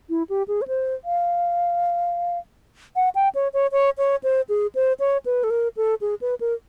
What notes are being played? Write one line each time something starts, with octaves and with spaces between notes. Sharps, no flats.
E4
G4
G#4
C#5
C5
F5
F#5
G5
C#5
C#5
C#5
C#5
C5
G#4
C5
C#5
B4
A4
A#4
A4
G#4
B4
A#4